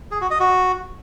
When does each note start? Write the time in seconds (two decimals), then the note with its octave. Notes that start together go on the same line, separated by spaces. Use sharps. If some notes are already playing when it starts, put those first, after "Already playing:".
0.11 G#4
0.21 F#4
0.31 D#5
0.40 F#4